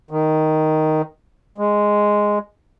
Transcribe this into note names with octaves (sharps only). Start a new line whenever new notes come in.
D#3
G#3